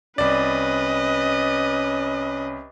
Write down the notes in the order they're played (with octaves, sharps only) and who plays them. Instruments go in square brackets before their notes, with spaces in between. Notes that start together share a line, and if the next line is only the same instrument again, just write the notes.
[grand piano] C2 D5 [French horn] C#4 [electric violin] B4 D#5